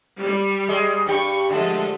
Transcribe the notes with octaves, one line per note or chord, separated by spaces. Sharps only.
G3
G#3
G2 G4 C#6
D3 F3 G#3 A3